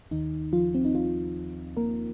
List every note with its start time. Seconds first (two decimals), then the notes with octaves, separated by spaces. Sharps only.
0.11 D#2 D#3 D#4
0.53 F3 F4
0.74 C4
0.85 D#4
0.95 F3 F4
1.77 A#3 A#4